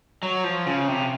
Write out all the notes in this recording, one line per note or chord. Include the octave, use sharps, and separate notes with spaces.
F#3
F3
C#3
C3